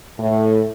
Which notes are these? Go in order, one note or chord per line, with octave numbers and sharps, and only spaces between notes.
A2